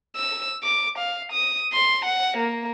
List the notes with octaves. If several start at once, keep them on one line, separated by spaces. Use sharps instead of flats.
E6
D6
F5
D#6
C6
F#5
A#3